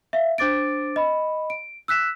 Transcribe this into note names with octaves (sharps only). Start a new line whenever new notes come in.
E5 F5
D4 C5 D6 A6 D7
D#5 B5
D7
E6 F#6 B6 E7